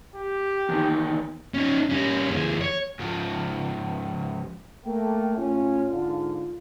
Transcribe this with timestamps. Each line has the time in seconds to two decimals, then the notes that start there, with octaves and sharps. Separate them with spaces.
0.15 G4
0.69 E2 D#3
1.54 C#4 D#4
1.90 G3 C#4
2.31 D#2 G#4
2.61 C#5
2.99 G#2 F3
4.85 A3 A#3 G5
5.37 A2 C#4 F4
5.88 G#2 D3